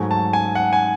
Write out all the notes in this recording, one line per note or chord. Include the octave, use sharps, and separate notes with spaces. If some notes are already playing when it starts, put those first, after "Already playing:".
Already playing: G#2 F#3 A3 G#5
A5
G#5
F#5
G#5